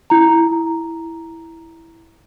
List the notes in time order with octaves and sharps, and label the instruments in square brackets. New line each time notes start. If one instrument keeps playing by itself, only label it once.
[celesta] E4 A#5